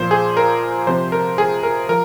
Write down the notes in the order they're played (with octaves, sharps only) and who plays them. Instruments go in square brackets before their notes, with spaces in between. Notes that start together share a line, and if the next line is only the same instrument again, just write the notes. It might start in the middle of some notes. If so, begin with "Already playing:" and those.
Already playing: [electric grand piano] A#2 F3 C5
G#4
A#4
C3 F3 C5
A#4
G#4
A#4
F3 A#4